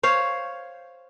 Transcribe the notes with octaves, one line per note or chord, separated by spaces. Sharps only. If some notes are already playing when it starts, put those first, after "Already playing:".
C5 C#5 F5